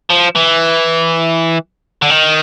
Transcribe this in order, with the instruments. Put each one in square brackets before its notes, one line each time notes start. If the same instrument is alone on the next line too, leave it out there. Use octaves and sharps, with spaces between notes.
[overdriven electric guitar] F3
E3
D3
D#3